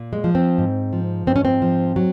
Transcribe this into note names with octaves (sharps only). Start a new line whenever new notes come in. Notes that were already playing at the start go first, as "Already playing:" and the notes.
Already playing: A#2
G#3
F3
C4
G#2
F3
G#2 C4
C#4
C4
F3
F#3